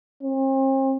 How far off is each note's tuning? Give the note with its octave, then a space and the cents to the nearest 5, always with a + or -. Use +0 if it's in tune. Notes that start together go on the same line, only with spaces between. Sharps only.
C4 +45